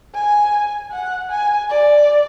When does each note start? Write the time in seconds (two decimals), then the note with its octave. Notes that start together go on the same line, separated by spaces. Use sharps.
0.15 G#5
0.92 F#5
1.30 G#5
1.69 D5